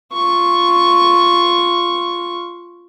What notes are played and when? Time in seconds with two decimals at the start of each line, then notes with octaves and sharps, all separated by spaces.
0.13 F4 C#6